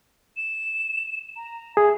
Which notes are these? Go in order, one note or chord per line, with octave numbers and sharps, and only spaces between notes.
E7
A#5
G#4 E5